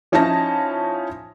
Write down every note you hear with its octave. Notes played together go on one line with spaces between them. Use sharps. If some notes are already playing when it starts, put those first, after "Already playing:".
F3 C#4 D#4 E4 A5 A#6